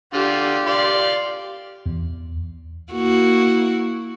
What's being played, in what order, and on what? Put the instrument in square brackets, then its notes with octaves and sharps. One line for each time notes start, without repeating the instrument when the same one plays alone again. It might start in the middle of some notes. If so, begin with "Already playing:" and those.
[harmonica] D3 F4 [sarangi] G4
[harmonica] D5 F5 C6
[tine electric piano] E2
[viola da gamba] A#3 E4 F#4